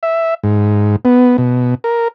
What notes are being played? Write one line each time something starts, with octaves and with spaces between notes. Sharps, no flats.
E5
G#2
B3
B2
A#4